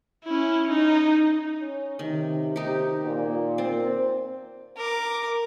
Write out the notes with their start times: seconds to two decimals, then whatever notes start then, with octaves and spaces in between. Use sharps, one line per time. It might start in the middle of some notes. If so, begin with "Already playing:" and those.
0.24 C#4 E4
0.69 D#4
1.60 C#4
1.99 C3 D#3
2.56 D#4 G4
3.05 A#2
3.58 C4
4.77 A#4 D6